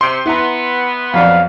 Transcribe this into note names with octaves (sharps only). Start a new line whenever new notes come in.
C3 C6
B3 E4 A#5
F2 F#3 D5 F5